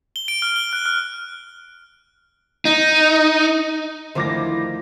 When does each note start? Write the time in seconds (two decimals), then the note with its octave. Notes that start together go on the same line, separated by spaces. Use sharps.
0.16 G7
0.28 D7
0.42 F6
0.56 G7
0.73 F#6
0.86 F6
2.65 D#4
4.15 D2 D#3 F3 E4 A#4 C5 D6 A#6